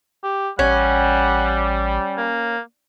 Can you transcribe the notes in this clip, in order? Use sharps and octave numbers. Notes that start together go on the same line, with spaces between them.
G4
A1 G3 C#4 F#5
A#3